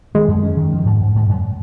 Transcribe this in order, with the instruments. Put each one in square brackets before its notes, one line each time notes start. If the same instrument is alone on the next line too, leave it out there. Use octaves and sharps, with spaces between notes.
[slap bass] D#3 [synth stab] G#3
[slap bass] F#2
C#4
D#3
F3
G#2
G#2
G#2
F#2